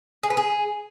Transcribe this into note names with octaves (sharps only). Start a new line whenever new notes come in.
G#4
B4
G#4